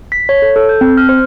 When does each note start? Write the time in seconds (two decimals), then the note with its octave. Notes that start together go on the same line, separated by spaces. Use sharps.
0.12 B6
0.29 C#5
0.42 A4
0.56 A4
0.69 G6
0.81 C4
0.97 F6
1.09 C5